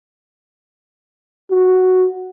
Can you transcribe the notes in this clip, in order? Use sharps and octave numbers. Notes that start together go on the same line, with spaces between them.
F#4